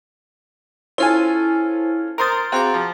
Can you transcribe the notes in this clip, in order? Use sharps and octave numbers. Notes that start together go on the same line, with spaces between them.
C#4 E4 F4 A4 C5 G#5 A5
A#4 C5 A#5 C6 D#6 A6
C4 F#4 G#4 F5 D6
F3